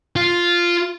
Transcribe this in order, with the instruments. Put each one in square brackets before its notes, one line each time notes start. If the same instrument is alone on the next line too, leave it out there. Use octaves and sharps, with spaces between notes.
[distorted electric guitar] F4